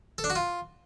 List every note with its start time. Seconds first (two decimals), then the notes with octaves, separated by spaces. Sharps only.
0.18 A4
0.24 D4
0.30 F#4
0.35 F4